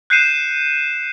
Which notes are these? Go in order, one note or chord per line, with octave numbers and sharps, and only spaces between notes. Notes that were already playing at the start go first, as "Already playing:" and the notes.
F#6 G6 C7 C#7 D#7 E7